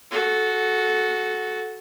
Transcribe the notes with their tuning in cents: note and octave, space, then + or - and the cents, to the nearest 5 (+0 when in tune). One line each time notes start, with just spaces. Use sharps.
F#4 +0 A4 -20